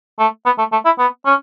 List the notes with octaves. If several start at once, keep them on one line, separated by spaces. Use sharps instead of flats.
A3
B3
A3
A3
E4
B3
C#4